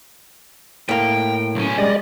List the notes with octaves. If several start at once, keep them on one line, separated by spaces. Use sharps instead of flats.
A2 A#3 G5
B1 C#4
G3 G#3 D5 D#5